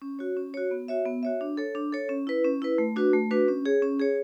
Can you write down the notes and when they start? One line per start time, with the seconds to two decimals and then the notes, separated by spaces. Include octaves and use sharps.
0.02 C#4
0.19 F#4 C#5
0.37 C#4
0.54 F#4 C#5
0.71 B3
0.88 F#4 C#5 E5
1.06 B3
1.23 F#4 C#5 E5
1.41 D4
1.57 A4 C#5
1.75 D4
1.92 A4 C#5
2.09 C#4
2.27 E4 B4
2.44 C#4
2.62 E4 B4
2.78 A3
2.96 D4 F#4 B4
3.13 A3
3.31 D4 F#4 B4
3.48 C#4
3.66 G#4 C#5
3.82 C#4
4.00 G#4 C#5